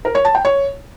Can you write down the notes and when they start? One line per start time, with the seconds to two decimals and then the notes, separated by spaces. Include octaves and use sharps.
0.05 A#4
0.15 C#5
0.25 A5
0.35 G5
0.45 C#5